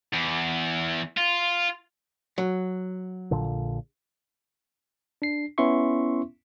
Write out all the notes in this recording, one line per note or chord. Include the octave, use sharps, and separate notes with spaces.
E2
F4
F#3
A#1 A#2 D3
D4 C7
B3 C#4 E4 E5 C6 C#6